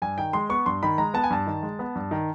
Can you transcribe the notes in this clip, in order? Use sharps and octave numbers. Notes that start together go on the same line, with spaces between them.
G2 G#5
D#3 G5
G#3 C6
B3 C#6
G2 C6
D#3 B5
G#3 A#5
B3 A5
G#5
G2 A5
D#3
G#3
B3
G2
D#3